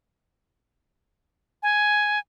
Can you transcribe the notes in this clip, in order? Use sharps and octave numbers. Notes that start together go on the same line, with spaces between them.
G#5